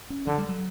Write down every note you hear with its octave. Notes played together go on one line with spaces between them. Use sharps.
C#4
D3 E3
G3
F#3